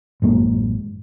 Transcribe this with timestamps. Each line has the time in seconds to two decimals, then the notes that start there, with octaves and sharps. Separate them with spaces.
0.22 A1 F#2 G#3 A#3